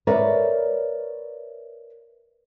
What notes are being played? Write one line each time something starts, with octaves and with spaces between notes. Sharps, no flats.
A#4 B4 C#5 D5 E5